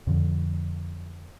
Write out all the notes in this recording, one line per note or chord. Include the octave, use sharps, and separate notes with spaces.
F2 A2 D3 F3